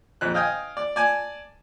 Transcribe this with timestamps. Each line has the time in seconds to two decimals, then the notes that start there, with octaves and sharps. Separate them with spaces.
0.21 A#1 F2 F#6
0.34 D#5 F5 G5 G#5 D#6
0.77 D5
0.96 D5 G#5 A5